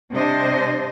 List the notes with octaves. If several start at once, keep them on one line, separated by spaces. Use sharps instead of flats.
C3 G3 D4 C5 D#5